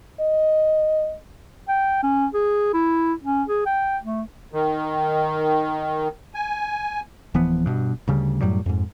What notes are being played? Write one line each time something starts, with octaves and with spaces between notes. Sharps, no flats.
D#5
G5
C#4
G#4
E4
C#4
G#4
G5
A3
D#3
G#5
D1 E3 F3 B3
G2 B2
D2 C#3 G3
F#2 A2 F#3 G3
F2 G#2